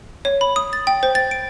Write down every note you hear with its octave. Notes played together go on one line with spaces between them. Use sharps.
C#5
B5
D#6
A6
G5
C5
A6
D7